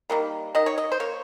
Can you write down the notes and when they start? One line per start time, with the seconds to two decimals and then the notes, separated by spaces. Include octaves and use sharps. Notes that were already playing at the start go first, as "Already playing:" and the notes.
0.10 D#3 G3 A#3
0.55 D#3 D#5
0.66 C#5
0.78 D#5
0.92 C5
1.00 A#3 C#5